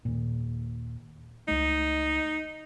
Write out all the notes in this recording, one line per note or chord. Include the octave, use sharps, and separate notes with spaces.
D#2 A#2
C#2 A3 D#4